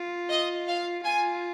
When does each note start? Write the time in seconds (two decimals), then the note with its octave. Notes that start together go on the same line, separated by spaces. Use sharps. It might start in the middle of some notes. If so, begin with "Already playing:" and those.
Already playing: F4
0.30 D#5
0.68 F5
1.05 F4 G#5